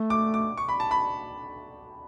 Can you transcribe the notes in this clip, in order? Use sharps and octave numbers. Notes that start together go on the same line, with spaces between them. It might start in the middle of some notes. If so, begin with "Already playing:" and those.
Already playing: A3
D6
D6
C#6
B5
A5
B5